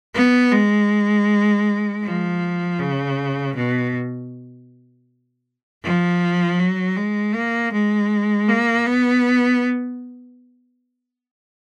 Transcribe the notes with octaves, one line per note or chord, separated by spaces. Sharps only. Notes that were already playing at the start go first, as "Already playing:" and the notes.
B3
G#3
F3
C#3
B2
F3
F#3
G#3
A#3
G#3
A#3
B3